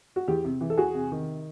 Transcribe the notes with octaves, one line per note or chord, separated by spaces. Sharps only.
F#4
E2 G4
C3
E3
A4
E2 F#4 G#4
C3
D#3